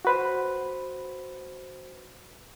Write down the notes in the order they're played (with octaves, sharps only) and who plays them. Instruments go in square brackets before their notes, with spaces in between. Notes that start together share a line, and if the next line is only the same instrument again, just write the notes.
[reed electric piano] F#4 B4 C5